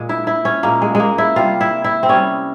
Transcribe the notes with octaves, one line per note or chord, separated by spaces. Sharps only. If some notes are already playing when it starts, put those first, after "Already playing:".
Already playing: A#2 G#3
E4
E4
C#4
A#2 G#3 A#3
G#3
G#3 A#3
E4
C3 G3 F4
E4
E4
C4
C3 G3 C#4